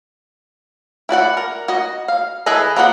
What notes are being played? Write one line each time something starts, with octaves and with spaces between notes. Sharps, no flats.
E4 F#4 D5 F#5
A#4
F#4 D#5
F5
E3 G#4 A4 B4 D#5
A#3 B3 F4 D5 F#5